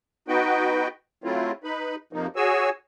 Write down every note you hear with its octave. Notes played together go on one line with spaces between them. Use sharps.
B3 D#4 F#4 B4 G5
F#3 A3 C4 E4 F4
D#4 B4 B5
F2 C3 F3 A#3 D#4
F#4 G#4 C#5 G#5 E6